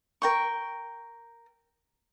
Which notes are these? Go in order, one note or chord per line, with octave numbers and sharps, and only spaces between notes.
A#4 G5 C#6